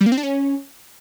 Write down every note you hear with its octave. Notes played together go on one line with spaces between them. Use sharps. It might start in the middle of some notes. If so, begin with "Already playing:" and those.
G3
A#3
C4
D4
C#4